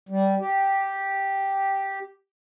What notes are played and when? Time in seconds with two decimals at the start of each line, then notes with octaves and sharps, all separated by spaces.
0.09 G3
0.40 G4